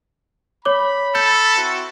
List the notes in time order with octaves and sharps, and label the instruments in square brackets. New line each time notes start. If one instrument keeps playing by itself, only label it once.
[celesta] C#5 D6 [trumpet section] B5
[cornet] A4 [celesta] G6
[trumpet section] C4 E4 F#4